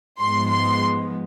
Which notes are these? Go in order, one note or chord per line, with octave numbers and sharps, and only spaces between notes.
G#2 F3 G#3 B3 C6
C6